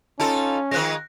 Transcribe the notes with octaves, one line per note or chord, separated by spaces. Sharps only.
C#4 D#4 F4 A4 A5
D#3 F3 G#3 F#6 A#6